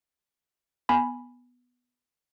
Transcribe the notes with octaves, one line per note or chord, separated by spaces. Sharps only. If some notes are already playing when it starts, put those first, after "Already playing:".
B3 G#5 B5